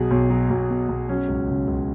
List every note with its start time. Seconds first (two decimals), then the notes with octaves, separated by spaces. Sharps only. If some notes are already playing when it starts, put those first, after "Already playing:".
Already playing: B1 B2 F#3 G#4
0.11 B1
0.30 F#3
0.50 B1
0.70 B2
0.89 B1
1.09 F#3 C#4
1.28 C#2
1.49 C#3
1.68 C#2